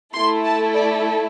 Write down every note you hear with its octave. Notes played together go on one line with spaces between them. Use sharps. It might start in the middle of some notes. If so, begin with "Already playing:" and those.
A3 E4 A4 C6
A5
D5